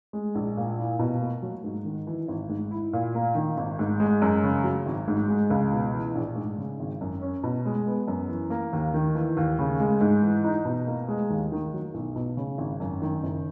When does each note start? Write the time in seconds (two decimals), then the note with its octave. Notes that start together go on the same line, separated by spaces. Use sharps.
0.13 G#3
0.35 A#1
0.57 A#2
0.78 E4
0.99 B2
1.21 A#3
1.42 F#3
1.64 G#2
1.85 D#3
2.07 E3
2.28 G#1
2.49 G#2
2.71 E4
2.93 A#2
3.14 A#3
3.35 D#3
3.57 G#1
3.79 G#2
4.00 G#3
4.22 F#2
4.43 C#3
4.64 F#3
4.86 G#1
5.08 G#2
5.28 G#3
5.50 C#2
5.72 B2
5.94 E3
6.15 A#1
6.36 G#2
6.58 C#3
6.80 G#1
7.01 F#2
7.22 C#4
7.43 B2
7.65 G#3
7.87 B3
8.08 F#2
8.29 E3
8.50 A#3
8.73 D#2
8.94 D#3
9.15 E3
9.37 D#2
9.59 C#3
9.80 G#3
10.01 G#2
10.22 E3
10.44 D#4
10.65 B2
10.87 A#3
11.08 G#3
11.30 D#2
11.52 D#3
11.73 F#3
11.94 B1
12.16 B2
12.37 C#3
12.58 G#1
12.80 F#2
13.02 D#3
13.23 F#1